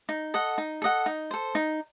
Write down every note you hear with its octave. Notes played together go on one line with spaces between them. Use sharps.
D#4
A4 D#5 F#5
D#4
A4 D#5 F#5
D#4
A4 C5
D#4